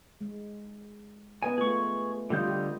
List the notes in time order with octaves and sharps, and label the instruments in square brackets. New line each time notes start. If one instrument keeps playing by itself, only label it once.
[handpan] G#3
[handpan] B3 B4 D#5 [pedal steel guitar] G#5
[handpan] A3 F4 [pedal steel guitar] G#4 C#6
[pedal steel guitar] D3 G3 G6 [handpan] F4 D#5
[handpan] G4